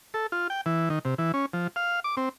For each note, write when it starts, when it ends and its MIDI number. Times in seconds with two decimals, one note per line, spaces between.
0.14 0.27 69
0.32 0.48 65
0.50 0.61 79
0.66 0.89 52
0.90 0.99 51
1.05 1.14 48
1.18 1.32 52
1.34 1.46 61
1.53 1.67 53
1.76 2.00 77
2.04 2.15 86
2.17 2.29 60